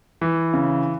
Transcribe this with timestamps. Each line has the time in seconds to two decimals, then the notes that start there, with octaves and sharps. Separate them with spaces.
0.21 E3
0.54 C#3